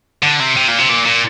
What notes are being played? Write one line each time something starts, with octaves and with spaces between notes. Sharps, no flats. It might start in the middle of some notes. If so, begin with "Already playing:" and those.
D3
C3
C3
A#2
C3
A#2
A#2